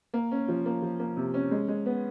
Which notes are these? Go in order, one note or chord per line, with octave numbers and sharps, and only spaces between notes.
A#3
C#4
F3
A#3
F3
A#3
C3
C#4
G#3
G#3
B3